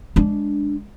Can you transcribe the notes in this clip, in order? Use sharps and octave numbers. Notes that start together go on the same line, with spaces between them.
G#3 D4